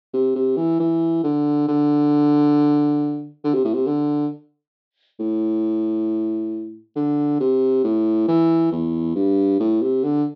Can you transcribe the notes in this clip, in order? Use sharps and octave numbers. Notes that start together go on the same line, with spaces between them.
C3
C3
E3
E3
D3
D3
D3
C3
A2
C3
D3
A2
D3
C3
A2
E3
E2
G2
A2
C3
D3